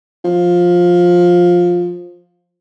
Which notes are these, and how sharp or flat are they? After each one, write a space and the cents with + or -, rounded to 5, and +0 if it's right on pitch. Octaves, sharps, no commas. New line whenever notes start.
F3 +10